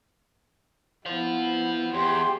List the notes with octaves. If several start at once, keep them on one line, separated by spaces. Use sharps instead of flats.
B3 E4 C5 F5
E2 G4 G#4 C6